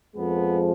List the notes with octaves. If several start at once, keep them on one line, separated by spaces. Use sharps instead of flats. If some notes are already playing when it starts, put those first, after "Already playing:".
F2 F3 G#3 B3